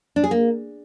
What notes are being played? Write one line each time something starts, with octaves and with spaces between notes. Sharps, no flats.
D4
G#4
A#3